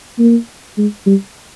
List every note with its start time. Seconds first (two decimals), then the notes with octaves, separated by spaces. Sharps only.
0.19 A#3
0.78 G#3
1.06 G3